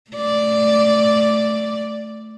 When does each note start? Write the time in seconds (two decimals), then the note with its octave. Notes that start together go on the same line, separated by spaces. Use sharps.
0.11 A3 D5